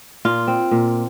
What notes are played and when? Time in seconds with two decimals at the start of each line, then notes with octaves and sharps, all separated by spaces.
0.25 A#2 F4
0.48 C4
0.71 A#2